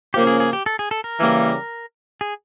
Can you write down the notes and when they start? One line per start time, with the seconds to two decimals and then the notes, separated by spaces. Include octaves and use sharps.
0.14 C#3 F3 A#3 C#4 G4
0.27 G#4
0.40 G#4
0.53 G4
0.66 A4
0.79 G#4
0.91 A4
1.04 A#4
1.18 C#3 E3 G3 A#3
2.21 G#4